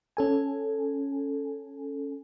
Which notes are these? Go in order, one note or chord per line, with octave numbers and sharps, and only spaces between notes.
C#4 A4 G#5